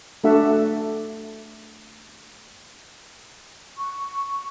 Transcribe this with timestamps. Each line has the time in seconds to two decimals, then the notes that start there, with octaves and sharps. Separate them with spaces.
0.24 A3 D4 F#4 A4 E5 F#5
3.78 C#6